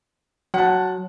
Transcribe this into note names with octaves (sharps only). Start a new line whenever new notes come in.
F#3 F#5 A5